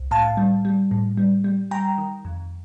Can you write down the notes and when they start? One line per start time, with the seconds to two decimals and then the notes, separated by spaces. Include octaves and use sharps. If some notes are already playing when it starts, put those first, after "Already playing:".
Already playing: C2
0.11 A2 F5 A5
0.37 G3
0.65 G3
0.91 A2
1.17 G3
1.44 G3
1.71 G3 G5 A#5
1.98 D#3
2.25 F2